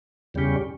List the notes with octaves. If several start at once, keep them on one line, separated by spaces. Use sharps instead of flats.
E2 C#3 G3 C#4 G4